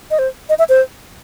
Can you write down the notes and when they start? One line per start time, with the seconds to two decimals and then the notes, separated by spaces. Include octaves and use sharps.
0.11 D#5
0.19 C5
0.49 D#5
0.59 E5
0.69 C5